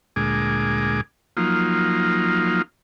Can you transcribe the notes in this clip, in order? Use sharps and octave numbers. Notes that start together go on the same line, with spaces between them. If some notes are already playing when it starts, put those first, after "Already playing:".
D2 A#2 G#3 G#4 D6
F3 F#3 A#3 D#4 F4